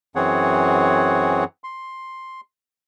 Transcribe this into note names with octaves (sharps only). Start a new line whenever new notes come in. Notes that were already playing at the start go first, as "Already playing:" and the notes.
F#2 E3 C4 G#4 C#5 F#5
C6